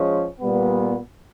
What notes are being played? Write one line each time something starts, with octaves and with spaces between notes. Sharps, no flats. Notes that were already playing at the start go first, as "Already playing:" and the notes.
Already playing: F3 G#3 C#4
A#2 G3 B3